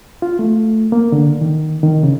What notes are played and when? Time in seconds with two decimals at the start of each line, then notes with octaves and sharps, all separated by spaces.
0.22 F4
0.39 A3
0.92 A#3
1.12 D3
1.41 D#3
1.83 D#3
2.03 C#3